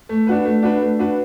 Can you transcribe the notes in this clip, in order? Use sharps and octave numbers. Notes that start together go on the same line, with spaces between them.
A3
D4 F#4 B4
A3
D4 F#4 B4
A3
D4 F#4 B4